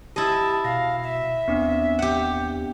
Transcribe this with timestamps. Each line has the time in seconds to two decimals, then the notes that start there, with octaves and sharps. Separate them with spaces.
0.16 E4 G4 D#5 A5 A6
0.65 B2 F5 A#6
1.03 E5
1.48 D#2 B3 C4 D4
1.99 G4 F#5